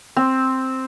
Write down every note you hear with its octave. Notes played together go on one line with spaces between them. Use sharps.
C4